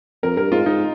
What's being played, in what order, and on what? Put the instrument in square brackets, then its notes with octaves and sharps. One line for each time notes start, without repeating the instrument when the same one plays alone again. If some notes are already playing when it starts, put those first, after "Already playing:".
[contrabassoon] F2 [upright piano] A#4
[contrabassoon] G2 [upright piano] A#4
[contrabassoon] G#2 [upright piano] F4
[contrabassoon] G#2 [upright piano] D#4